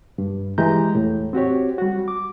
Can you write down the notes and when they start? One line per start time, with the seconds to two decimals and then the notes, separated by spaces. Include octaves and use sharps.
0.18 G2
0.58 E3 G#3 G4 A#5 G6
0.95 E2 A2
1.33 C4 F#4 G4 C#5
1.78 G3 F#4
2.08 D6